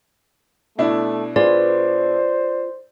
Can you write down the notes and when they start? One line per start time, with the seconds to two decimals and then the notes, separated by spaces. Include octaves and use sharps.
0.78 B2 A3 D4 E4
1.36 F4 G#4 B4 C5 D5